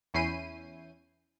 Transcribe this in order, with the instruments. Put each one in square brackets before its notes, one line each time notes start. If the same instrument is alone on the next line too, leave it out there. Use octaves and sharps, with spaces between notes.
[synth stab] E2 C#4 E4 G6 C7 D#7